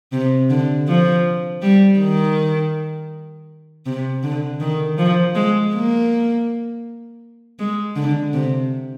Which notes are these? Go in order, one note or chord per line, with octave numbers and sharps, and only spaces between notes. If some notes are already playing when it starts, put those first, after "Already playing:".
C3
D3
F3
G3
D#3
C3
D3
D#3
F3
G#3
A#3
G#3
D3
C3